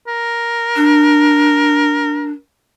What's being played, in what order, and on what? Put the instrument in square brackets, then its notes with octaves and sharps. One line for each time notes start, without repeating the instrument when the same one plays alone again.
[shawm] A#4
[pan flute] D4